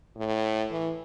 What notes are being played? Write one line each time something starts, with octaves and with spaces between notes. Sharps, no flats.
A2
E3